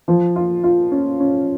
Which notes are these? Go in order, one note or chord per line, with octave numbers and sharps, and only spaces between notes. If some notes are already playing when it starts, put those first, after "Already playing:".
F3
F4
F4
C#4
C#4